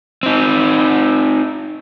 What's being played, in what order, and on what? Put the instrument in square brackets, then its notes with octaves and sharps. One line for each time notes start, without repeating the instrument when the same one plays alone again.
[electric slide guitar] C4 D#4